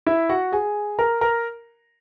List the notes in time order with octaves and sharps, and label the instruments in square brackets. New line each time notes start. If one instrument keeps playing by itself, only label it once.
[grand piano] E4 E5
F#4 F#5
G#4 G#5
A#4 A#5
A#4 A#5